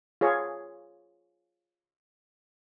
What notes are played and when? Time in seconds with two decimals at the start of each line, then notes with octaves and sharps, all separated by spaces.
0.21 F4 G#4 C#5